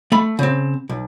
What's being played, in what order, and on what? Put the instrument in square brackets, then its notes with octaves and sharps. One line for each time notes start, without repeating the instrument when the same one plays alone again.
[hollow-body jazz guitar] A3 B5
C#3 C4
B1